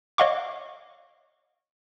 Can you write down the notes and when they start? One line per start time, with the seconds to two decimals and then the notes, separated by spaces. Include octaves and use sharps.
0.18 C#5 D#5 F5 F#5 C#6 D6